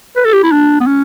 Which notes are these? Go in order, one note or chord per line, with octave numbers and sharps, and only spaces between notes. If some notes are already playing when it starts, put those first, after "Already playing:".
B4
A4
G4
E4
D4
B3
C#4